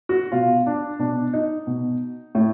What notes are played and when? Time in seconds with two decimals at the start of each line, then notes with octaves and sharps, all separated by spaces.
0.09 F#4
0.32 B2 F4
0.66 D4
0.99 B2 D4
1.33 D#4
1.67 B2
2.35 A2